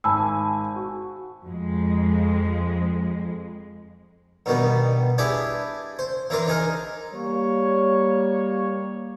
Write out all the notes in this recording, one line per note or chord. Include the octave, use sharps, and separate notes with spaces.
G#1 G#5 A5 B5 E6
F#4
F2 G#3
G2 B2 D#3 B3
D4 E4 G4 G#4 B4
C5
E3 D4 A#4 C5
D#4 G#4 A#4
G3 A#3 C#5